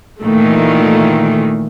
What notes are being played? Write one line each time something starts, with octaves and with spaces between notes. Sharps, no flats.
A#2 D#3 E3 A3